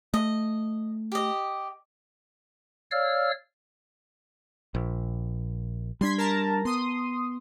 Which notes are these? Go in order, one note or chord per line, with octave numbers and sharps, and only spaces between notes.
A3 D#5
G4 D#5
C#5 D5 F5 E6 F6
A#1
G3 D4 C6 G#6 B6
A#4 A5 A#5
B3 C6 D#6